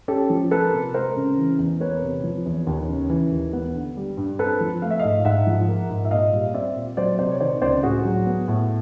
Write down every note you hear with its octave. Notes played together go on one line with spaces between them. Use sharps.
C#4 G4 A4
F3
A#3 A4 B4
C3
G#3 A#4 C5
C#3
E3
E2
A#3 B4 C#5
C3
F3
E2
D#2
C#3
E3
D#2
B3
D3
G3
G2
C4 A4 B4
F3
A3 F5
E5
G#2 D#5 F5
G#2 E5 F#5
F3
A#3
G#2
E5
A#2 D#5 F5
G3
C4 D5 E5
A#2
F#3 C5 D5
C3 C5 D5
C#5
D#3 C5 D5
C#2 C5 D5
A2 F#4 G#4
F#3
B3
A2